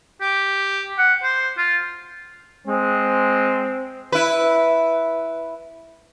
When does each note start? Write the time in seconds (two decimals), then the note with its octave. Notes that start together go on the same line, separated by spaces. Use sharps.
0.21 G4
0.98 F#5
1.23 C5
1.58 F4
2.67 G#3 C4
4.12 E4 B4